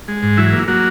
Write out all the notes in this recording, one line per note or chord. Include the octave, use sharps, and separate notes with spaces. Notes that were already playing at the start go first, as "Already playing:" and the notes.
G#3
G#2
E3 F#3 E4
A#3
F#3 A#3 F#4